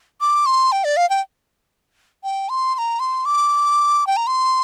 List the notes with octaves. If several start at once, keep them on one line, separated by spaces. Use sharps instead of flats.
D6
C6
G5
D5
F5
G5
G5
C6
C6
A#5
C6
D6
G5
A#5
C6